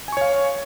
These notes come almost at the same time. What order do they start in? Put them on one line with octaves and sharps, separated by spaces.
G#5 C#6 C#5 F5